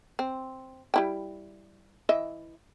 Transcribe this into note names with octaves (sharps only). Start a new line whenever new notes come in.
C4
G3 E4 G5
E3 D#5 E5